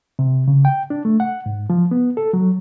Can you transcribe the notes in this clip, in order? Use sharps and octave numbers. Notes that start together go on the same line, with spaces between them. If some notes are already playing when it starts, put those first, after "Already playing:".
C3
C#3
G5
D4
A3
F#5
G#2
F3
B3
A4
F#3